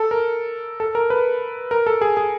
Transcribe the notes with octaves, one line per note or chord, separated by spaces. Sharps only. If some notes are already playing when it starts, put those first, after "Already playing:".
Already playing: A4
A#4
A4
A#4
B4
A#4
A4
G#4
G#4